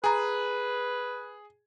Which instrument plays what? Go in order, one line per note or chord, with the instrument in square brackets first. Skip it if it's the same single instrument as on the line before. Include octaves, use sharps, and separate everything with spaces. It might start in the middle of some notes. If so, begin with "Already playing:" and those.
[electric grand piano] G#4 [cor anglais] B4 [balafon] G#5 A#5